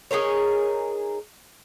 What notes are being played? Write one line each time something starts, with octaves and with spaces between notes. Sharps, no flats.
D#4 G#4 A#4 C#5